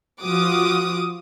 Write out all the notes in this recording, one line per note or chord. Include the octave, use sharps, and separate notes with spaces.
F3 F4 F#4 D6 D#6